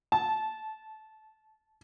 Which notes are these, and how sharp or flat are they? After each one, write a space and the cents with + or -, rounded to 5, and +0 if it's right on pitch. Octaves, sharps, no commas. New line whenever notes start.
A5 -15